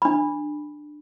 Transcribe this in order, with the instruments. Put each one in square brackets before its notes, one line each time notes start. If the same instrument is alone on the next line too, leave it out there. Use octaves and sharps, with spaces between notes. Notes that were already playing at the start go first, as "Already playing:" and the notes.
[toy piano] D4 B5